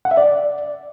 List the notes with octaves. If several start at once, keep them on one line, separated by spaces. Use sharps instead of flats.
F#5
E5
D5